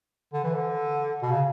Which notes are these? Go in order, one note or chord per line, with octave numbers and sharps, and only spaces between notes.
D3
E3
D3
B2
C#3